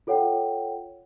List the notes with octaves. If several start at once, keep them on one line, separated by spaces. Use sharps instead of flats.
F4 A4 C#5 F#5 G5